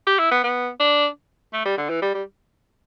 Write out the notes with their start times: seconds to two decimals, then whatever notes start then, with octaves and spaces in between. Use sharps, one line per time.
0.07 G4
0.19 E4
0.31 B3
0.44 B3
0.80 D4
1.53 A3
1.65 G3
1.77 D3
1.89 E3
2.02 G3
2.14 G3